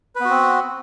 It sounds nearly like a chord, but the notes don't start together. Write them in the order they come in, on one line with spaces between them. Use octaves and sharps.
B4 B3 F#4 C4